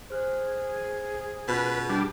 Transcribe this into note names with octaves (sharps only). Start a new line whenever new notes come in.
G#4 C5 F6 F#6
B2 C#4 F4 A#4 B4
G3 D4